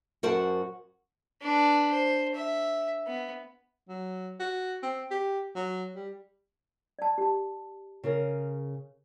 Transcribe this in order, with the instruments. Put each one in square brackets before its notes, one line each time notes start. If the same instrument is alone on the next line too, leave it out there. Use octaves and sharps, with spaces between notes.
[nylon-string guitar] F#2 F#4 A#4 C5 F#5 A5
[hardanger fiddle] D4 B4
C5
E5
B3
[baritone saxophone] F#3
F#4
C4
G4
F#3
G3
[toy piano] D5 A5
G4 A5
[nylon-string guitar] C#3 G#4 A#4